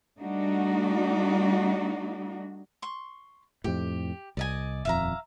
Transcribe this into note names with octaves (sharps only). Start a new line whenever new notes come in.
G3 A3 D4 D#4 F#4
C6 C#6
F2 A2 G4
C2 D5 D#5 G#5
D#1 F2 E5 F5 A#5